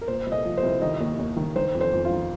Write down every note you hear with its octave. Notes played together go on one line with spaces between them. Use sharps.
A#4
A#2 C5
C2
D#5
F3
C5
C2
D#3 D#5
D#2
D#2
D#3
D#3 C5
F2
C5
F2
F4
D#3